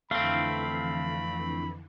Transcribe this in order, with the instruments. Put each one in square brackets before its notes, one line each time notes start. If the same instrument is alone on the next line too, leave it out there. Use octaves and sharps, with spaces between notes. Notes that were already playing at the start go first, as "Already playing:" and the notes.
[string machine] F2 D3 E3 [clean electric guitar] A3 C4 [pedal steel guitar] F5 [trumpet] B5